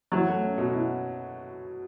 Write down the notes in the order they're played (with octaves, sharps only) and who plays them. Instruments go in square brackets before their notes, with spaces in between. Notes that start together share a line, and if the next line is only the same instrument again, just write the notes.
[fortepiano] F#3 [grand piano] E4
[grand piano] A3
C#4
B2
E4